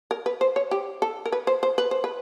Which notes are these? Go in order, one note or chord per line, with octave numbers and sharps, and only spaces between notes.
A#4
B4
C5
C#5
G4
A4
A#4
B4
C5
C5
B4
C5
B4